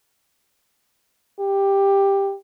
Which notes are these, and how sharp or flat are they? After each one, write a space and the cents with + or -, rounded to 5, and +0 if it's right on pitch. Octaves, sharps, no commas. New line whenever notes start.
G4 +10